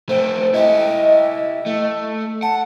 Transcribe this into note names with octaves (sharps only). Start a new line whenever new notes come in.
A3 C4 C5
E4 G4 D#5
A3
F#5 A5